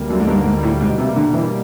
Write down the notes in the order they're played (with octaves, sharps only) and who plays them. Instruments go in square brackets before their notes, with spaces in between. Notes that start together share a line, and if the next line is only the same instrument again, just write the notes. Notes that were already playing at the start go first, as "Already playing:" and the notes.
Already playing: [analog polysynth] D2 G3 A#3
[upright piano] F#2 [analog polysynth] D3
[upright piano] G#2
G2
[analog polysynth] A#3
[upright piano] G#2
[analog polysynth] G3
[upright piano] A2
[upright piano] G#2 [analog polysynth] B2
[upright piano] C3
[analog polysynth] A#3
[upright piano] D3
[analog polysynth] B2
[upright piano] E3